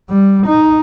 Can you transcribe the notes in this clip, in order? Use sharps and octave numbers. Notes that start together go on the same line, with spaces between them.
G3
D#4